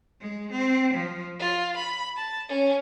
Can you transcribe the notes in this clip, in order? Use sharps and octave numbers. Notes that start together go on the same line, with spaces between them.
G#3
C4
F3
F4
B5
A5
C#4